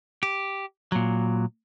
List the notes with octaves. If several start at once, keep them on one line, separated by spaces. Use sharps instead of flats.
G4
A#2 F#3